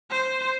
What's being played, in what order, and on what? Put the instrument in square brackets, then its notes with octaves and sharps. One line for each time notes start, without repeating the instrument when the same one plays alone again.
[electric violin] C5